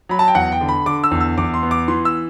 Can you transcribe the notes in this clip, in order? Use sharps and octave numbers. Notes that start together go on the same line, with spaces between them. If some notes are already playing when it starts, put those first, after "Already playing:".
F#3 B5
A5
G5
E2 F#5
G5
D3
B5
D3 D6
E6
E2
E6
E2 D6
C6
B3
D6
E3 C6
E6